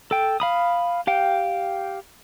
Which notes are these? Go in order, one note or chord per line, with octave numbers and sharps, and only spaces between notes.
A4 G5
F5 B5 D#6
G4 F5 G5